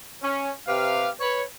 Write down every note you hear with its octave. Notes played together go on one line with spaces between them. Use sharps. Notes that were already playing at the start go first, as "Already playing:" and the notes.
C#4
C3 G4 B4 F5
B4 C#5